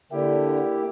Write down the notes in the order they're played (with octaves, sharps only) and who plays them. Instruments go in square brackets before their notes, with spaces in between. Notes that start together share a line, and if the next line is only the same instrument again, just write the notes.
[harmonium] D3 [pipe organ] A#3 E4 G4